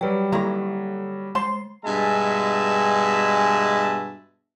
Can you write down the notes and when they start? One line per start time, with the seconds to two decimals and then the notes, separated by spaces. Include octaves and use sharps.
0.01 F#3 G3 B4 G5
0.32 D3 D#3 A#3 E4 A4 A#5
1.35 G#3 C5 A5 C6 C7
1.85 G2 B2 G#3 E5 G#5 A5